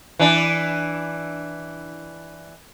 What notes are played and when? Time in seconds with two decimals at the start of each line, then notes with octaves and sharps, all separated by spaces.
0.19 E3 D4